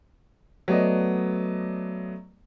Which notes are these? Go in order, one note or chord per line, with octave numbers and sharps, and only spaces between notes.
F#3 A3 B3 D5 D#5